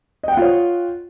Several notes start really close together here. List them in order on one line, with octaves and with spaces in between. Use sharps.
D#5 G5 F#5 F4 C#5